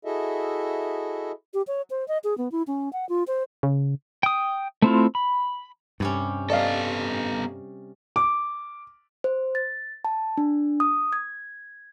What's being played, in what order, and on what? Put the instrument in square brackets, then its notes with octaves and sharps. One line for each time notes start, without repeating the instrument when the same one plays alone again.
[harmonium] E4 F#4 G#4 A4 D#5 E5
[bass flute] G4
C#5
C5
D#5
G#4
B3
E4
C#4
F#5
F4
C5
[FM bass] C#3
[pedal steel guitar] G5 D#6
A3 C4 E4 F4
B5
[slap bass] G2 [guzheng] C3 G3 C#4
[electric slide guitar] B3 A4 [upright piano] D5 D#5 F5
[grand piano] D6
[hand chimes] C5
A6
A5
D4
D#6
G#6